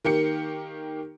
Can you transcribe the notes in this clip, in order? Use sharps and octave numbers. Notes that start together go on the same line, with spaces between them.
D#3 A#3 G4 C#7